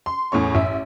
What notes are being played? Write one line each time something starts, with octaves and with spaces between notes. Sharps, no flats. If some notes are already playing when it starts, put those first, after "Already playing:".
C6
E2 A2 C#4 C#6
A1 E5